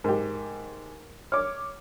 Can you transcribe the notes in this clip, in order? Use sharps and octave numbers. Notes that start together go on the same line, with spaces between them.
G#2 G4 A#4
C#5 D6 F6